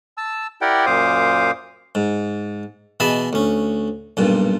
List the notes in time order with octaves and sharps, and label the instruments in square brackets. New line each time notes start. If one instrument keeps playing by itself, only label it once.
[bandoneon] A5 E6
E4 G4 A#4 D5 F#5 G5
F#2 A#2 C5 F5 D6 D#6
[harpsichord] G#2
B2 E3 G#4 D#5 A5 B5
D2 C#4
B1 G2 A#2